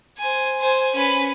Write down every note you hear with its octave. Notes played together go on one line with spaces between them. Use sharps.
C5 G#5
C5 G#5
C#4 B4